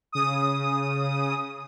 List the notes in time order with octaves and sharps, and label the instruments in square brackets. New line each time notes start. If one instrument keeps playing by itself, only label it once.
[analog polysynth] C#3 D#6